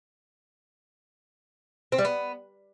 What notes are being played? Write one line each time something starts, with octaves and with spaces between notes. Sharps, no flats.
C4
G3
B3